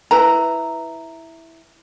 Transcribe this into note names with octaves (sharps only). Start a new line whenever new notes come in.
E4 B4 A#5